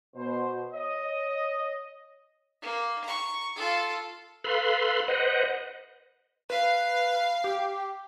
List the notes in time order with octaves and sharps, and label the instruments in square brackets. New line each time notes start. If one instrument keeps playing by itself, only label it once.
[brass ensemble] B2 C5
C#5 D#5
[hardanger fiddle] A#3
A#5 C#6
F4 A4
[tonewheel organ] A4 B4 F5 B5 C6
B4 C5 D#5 F#5
[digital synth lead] B4 [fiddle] F5
[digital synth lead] G4